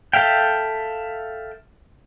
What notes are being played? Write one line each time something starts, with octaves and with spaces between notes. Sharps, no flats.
A4 E5 F5 G5